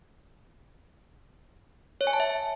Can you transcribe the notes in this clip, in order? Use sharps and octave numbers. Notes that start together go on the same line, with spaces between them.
C#5
G#5
A5
E5